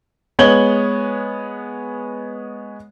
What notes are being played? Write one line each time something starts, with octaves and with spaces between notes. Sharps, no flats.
G#3 B3 C#5 G#6 F#7 G7